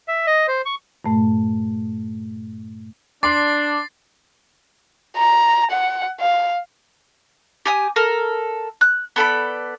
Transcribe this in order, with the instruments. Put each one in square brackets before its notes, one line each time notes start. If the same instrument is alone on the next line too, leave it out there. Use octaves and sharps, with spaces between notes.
[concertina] E5
D#5
C5
C#6
[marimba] G2 A#2 A3
[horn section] D4 [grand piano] C6 D6 [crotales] A6 C7
[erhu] A#5
F#5
F5
[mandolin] G4 G#5 D#6
A4 A#4
F#6
B3 A4 D5 B5